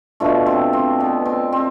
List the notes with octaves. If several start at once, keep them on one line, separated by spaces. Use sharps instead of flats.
B2 A3 D4 F4
C4
C4
B3
C4
C4